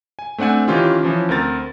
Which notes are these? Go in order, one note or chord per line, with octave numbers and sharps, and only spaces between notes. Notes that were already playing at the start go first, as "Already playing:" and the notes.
G#5
A3 C4 D4 F#5 G#5
D#3 E3 C#4 F4 G4
E3 F3 C#4
D2 C4 A#4 A6